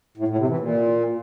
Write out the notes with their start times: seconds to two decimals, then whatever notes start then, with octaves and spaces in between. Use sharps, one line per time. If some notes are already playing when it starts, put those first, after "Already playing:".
0.18 A2
0.28 A2
0.38 C3
0.49 E3
0.59 A#2